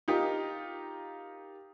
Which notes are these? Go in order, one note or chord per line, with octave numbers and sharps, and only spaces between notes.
D#4 F4 G4 A#4